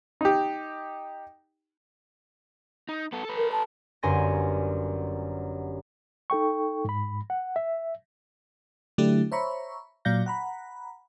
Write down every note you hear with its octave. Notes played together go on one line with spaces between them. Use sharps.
D#4 G4
D#4
B3 A4
A4 B4
A#4
A5
G1 F#2 G#5 C6 A#6
D#4 A4 G5 C#6
G#2 B5
F#5
E5
D3 F#3 A3 D4 E4 G4
C5 C#5 E5 A#5 B5 C#6
A#2 F#3 D5 F5 G6 A#6
F#5 A#5 B5